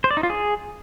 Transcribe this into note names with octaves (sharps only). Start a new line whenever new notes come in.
C5
D5
D#4
F4
G#4